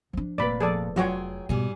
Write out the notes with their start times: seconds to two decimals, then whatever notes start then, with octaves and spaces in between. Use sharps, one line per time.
0.13 F3 D4
0.38 F1 A#2 B4 D5 B5
0.60 F3 G#4 A4 D5
0.96 F#3 F4 F#4 G#4 C#5 D5 G5
1.49 G#2 B2 G3 G#4